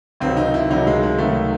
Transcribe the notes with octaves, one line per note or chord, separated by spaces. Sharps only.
C#2 C3 D#3 F#3 C4
D#4
E4
C#2 C3 D#3 F#3 D#4
G#3
G#3
C#2 C3 D#3 F#3 A3